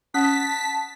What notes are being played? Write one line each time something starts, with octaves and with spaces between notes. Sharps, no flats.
C#4 F#5 A5 D#6 F#6 B6